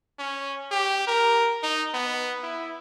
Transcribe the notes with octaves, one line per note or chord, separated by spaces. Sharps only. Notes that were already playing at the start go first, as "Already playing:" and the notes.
C#4
G4
A#4
D#4
B3
E4